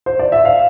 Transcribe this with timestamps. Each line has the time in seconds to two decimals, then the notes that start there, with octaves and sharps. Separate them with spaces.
0.06 C5
0.19 D5
0.32 E5
0.45 F5